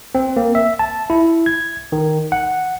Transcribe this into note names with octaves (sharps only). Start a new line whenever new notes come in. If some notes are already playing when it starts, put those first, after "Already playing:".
C4
A#3
E5
A5
E4
G#6
D#3
F#5